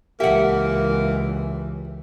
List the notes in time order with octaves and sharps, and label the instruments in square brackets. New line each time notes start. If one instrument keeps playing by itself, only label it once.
[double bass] C#2 E3 [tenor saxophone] A#3 [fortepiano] G4 [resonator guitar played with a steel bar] E5 F#5